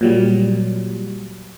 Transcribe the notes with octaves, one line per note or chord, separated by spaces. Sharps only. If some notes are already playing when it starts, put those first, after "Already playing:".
A#2 F#3 G3